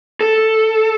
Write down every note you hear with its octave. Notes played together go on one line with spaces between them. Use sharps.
A4